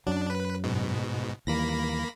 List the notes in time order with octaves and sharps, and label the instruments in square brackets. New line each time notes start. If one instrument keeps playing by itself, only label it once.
[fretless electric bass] F#2 F#3 [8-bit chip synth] D4
[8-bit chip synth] B4
G#2 B2
[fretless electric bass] D#2 E3 G3 [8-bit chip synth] A#3 B5 A#6